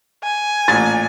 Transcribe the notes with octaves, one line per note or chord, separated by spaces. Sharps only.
G#5
A1 A#2 A6